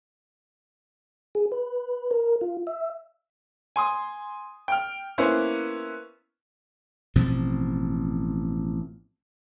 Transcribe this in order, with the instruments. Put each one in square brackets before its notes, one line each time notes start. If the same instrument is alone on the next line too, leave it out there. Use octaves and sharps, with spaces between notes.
[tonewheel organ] G#4
B4
A#4
F4
E5
[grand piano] G#5 C6 D#6
G5 F6
A#3 B3 C#4 E4 B4 C5
[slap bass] A1 B2 F3 C4